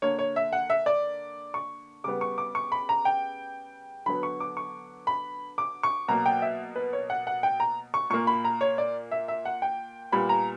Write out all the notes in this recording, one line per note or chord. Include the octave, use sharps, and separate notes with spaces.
D3 A#3 C#5
C#5
E5
F#5
E5
D5
C#6
C#3 G3 B3 D6
C#6
D6
C#6
B5
A#5
G5
D3 F#3 B3 B5
C#6
D6
C#6
B5
D6
C#6
B2 F#3 A#3 A#5
G5
E5
B4
C#5
F#5
F#5
G5
A#5
C#6
A#2 A#3 C#6
B5
A#5
C#5
D5
E5
E5
F#5
G5
A#2 G3 B3 B5
A#5